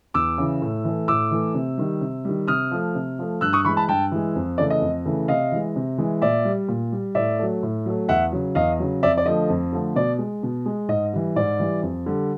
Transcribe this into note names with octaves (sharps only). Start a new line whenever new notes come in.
E2 D6 E6
C#3 E3
A2
E3 A3
A2 D6 E6
E3 A3
C3
D#3 G3
C3
D#3 G3
C3 D#6 F6
F3 A3
C3
F3 A3
G2 E6 F#6
C#6 D#6
E3 G#3 B5 C#6
A5 B5
G2 G5 A5
E3 G#3
F2
C#3 E3 A3 D5
D#5
F2
C#3 E3 A3
C3 D#5 F5
E3 G#3
C3
E3 G#3
A#2 D5 E5
G3
A#2
G3
A2 D5 E5
F#3 A3
A2
F#3 A3
E2 E5 F#5
C#3 F#3
E2 D#5 F5
C#3 F#3
F2 D5 E5
D5
D3 F3 A3 D#5
F2
D3 F3 A3
B2 D5
G#3
B2
G#3
G#2 D#5
E3 G3
G#2 D5
E3 G3
F2
D3 G3